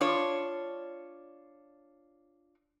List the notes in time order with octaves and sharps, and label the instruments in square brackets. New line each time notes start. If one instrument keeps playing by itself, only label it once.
[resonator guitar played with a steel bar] D4 F4 C#5